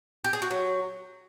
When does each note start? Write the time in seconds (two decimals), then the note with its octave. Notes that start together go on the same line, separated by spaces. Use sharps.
0.24 G4
0.33 G#4
0.42 F#4
0.51 F#3